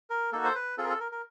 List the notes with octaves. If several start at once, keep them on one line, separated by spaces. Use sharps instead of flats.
A#4
A#3 D#4 F#4 A4
C5
B4
C4 F4 G#4 A4
A#4
A4
A#4
A#4